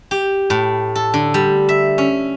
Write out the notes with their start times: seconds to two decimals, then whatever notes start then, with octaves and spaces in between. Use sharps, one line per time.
0.11 G4
0.50 A2
0.95 A4
1.14 D3
1.34 G3
1.69 E5
1.98 C#4